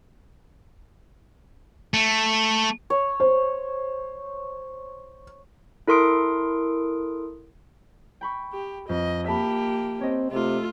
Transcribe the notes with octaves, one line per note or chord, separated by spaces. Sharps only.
A3
C#5
C5
E4 A4 A#4 C6 D#6 D7
G5 B5 C#6
G4
F2 D#5
A#3 G4 E5 A5 B5
C4 C#5 D#5
C3 A3 F4